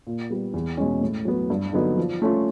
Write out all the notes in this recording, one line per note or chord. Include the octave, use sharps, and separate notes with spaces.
A#2
G3 B3
E2
B2 G#3 C#4
A2
F#3 B3
G2
D3 F#3 B3 D#4
F3
A3 C#4 F4